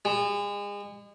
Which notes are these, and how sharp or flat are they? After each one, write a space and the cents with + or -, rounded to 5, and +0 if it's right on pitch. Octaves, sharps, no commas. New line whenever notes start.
G#3 -35